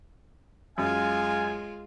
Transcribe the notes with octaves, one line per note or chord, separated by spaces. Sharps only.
F#2 G#3 F4 F5 G#5